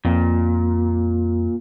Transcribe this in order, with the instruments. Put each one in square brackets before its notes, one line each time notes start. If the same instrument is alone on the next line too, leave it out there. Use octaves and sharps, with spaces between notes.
[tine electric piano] F2 [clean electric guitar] A#2